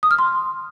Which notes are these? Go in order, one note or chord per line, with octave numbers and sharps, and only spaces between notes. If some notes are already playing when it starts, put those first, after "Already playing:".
D#6
F6
C6